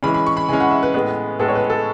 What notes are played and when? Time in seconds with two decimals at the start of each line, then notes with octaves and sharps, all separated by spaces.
0.03 E3 G#3 C#4 B5
0.14 B5
0.27 C#6
0.37 B5
0.49 E3 G#3 C#4 G#5
0.60 F#5
0.71 E5
0.83 B4
0.94 A2 G#3 B3 B4
1.39 A2 G#3 B3 A4
1.48 C#5
1.55 B4
1.70 A4